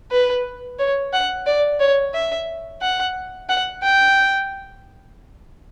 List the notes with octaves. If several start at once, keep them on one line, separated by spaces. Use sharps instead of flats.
B4
C#5
F#5
D5
C#5
E5
F#5
F#5
G5